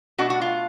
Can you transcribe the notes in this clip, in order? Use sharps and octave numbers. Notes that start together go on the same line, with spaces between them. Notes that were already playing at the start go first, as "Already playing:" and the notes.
B2 A3 D4 F#4
F#4
F4